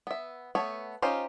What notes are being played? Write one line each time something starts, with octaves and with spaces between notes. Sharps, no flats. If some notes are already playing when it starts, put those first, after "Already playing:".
B3 E5
A3 B3 C#5
C#4 D#4 F4 G4 C5